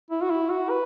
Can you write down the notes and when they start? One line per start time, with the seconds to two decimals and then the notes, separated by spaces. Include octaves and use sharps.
0.11 E4
0.22 F#4
0.31 E4
0.50 F#4
0.70 B4